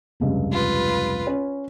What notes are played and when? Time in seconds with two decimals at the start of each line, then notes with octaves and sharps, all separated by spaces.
0.20 F1 C#2 G2
0.52 F4 B4
1.27 C#4 C#5